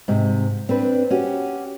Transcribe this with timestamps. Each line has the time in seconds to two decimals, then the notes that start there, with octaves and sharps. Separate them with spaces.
0.08 G#2 C3
0.69 C4 D4 B4
1.11 C#4 F#4 G4